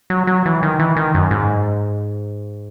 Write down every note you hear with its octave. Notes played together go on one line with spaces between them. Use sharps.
F#3
F#3
E3
D#3
E3
D#3
F#2
G#2